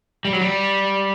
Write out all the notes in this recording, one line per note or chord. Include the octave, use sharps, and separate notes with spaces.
G3
F#3
G3